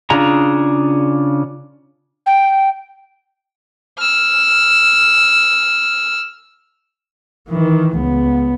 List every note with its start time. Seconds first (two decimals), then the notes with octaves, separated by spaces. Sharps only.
0.10 C#3 D4 F4 G#4 A#5
2.26 G5
3.98 E6 F6
7.49 D#3 E3
7.97 C#2 B3